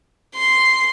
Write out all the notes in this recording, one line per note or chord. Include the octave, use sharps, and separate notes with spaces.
C6